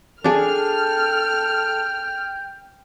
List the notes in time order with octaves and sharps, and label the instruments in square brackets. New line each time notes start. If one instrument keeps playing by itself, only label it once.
[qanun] D4 G#4 [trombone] A4 [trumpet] G5 [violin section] F6